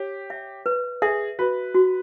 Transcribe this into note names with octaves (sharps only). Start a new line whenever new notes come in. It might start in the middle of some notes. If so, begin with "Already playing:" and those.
Already playing: G4 C#5
E5
B4
G#4 E5
F#4 B4
F#4